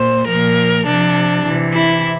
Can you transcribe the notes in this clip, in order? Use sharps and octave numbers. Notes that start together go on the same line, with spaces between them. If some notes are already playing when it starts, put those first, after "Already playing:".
Already playing: A#2 C5
F3 A#4
A#2
C3 F3 D4
C3 E3
E4